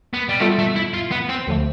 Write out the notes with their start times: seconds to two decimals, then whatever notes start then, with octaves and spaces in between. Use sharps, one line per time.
0.14 B3
0.29 G3
0.40 G3 A3 B3 F4 A4 E5
0.59 A3
0.76 E4
0.94 F4
1.11 B3
1.29 C4
1.47 D2 D3 F3 A3